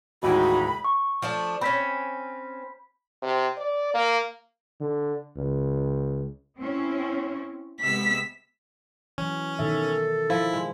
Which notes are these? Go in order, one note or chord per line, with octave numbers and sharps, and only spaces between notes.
D#2 A2 E3 G#3 D#4 F#4 B5
C#6
F3 A3 D4
C4 C#4 B5 G6 B6
C3
D5
A#3
D3
C#2
C4 C#4 E4
C3 G#3 B3 E6 B6
E3 F#3 C#4
B2 D#3 A4 E5
F3 E4
G#3